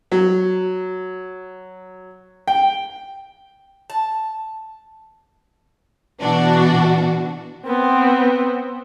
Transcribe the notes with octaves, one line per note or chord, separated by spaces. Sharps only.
F#3
G5
A5
B2 E3 D4 F#4
B3 C4